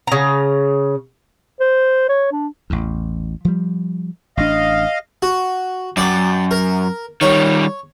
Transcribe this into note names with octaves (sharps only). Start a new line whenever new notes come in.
C#3 A#5
C5
C#5
D4
A1 E2
F3 G3
A1 D4 D#5 F5
F#4
F#2 D5 G5
A#4
D#3 G3 C#5